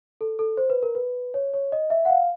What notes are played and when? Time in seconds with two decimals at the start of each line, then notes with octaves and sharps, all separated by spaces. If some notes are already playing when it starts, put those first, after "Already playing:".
0.21 A4
0.39 A4
0.57 C5
0.70 B4
0.83 A#4
0.95 B4
1.34 C#5
1.54 C#5
1.72 D#5
1.90 E5
2.05 F#5
2.09 F5